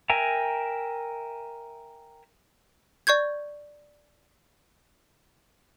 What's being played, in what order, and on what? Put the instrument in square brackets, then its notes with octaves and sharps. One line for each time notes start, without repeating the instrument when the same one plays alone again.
[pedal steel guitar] A#4 E5 G5 G#5 A#5
[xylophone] D5 C#6 G6 G#6